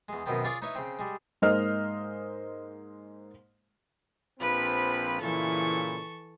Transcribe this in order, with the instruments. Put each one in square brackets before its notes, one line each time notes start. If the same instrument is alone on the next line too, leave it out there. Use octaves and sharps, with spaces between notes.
[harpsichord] E2 G#3
F#2 B2 D#3 B3 C4
F4 G#4 C#5 D5
D#4 E4 B4 C#5 E5
C#3 C4
G3 G#3
[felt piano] G#2 G#3 A#3 C5 D#5 F6
[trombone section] A#1 F3 C4 [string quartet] B4 B5
[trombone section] A#2 C#3 E4 [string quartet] E3 A4 C#6